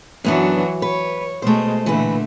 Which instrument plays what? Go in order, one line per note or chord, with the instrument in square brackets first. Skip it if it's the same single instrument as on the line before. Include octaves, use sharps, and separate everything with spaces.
[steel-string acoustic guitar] F#2 B3 D4 [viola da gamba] E3 F#3 F#4
[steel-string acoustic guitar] B4 [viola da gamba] C#5
[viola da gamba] B2 G#3 [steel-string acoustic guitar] A3 C5
[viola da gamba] A#2 D3 A3 [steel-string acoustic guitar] E3 B4